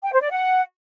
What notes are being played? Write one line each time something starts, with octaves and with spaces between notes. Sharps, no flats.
G5
C5
D5
F#5